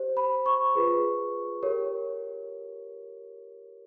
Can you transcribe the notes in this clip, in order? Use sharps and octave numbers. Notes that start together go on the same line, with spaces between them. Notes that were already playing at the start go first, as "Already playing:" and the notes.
Already playing: G4 C5
B5
C#6
F4 G#4 B4
G4 A#4 C#5